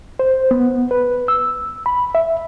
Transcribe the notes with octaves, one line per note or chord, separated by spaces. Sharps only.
C5
B3
B4
E6
B5
E5